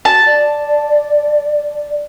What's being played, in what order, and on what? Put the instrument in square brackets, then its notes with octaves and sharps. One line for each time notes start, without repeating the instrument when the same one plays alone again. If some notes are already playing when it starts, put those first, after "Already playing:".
[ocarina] F#4 [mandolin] A5
[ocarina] D5